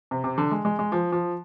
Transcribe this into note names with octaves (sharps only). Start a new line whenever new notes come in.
C3
C3
D3
G#3
G#3
G#3
F3
F3